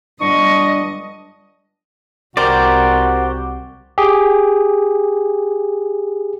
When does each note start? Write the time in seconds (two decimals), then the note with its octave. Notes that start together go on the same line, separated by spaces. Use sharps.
0.21 G1 D4 D#5 C#6
2.37 C2 F#4 G4 A#4 C5 D5
3.98 G4 G#4